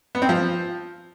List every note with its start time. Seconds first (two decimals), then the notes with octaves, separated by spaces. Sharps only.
0.15 B3
0.22 C4
0.29 F3